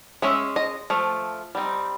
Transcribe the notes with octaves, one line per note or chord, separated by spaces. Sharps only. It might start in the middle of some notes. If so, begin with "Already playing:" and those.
G#3 C#4 E5
D#5
F3 A3
G3 C4 D#4